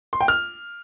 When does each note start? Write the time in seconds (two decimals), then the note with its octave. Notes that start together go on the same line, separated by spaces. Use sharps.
0.13 C6
0.21 G5
0.28 F6